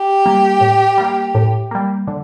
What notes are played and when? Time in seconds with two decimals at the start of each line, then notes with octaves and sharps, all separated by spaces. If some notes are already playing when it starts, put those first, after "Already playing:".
Already playing: G4
0.26 G3 A#3
0.61 A2
0.98 G3 A#3
1.35 A2
1.71 G3 A#3
2.07 D3